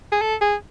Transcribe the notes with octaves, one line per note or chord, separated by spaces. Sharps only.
G#4
A4
G#4